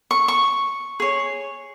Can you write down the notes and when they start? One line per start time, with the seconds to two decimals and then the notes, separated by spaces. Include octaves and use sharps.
0.11 C#6
0.28 C#6
1.00 G#4 C#5